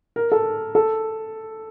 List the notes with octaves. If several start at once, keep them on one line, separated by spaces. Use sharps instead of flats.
A#4
A4
A4